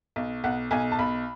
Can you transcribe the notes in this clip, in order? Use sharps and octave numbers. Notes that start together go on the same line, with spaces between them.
B1
B1 F#5
B1 G#5
A5
B1 B5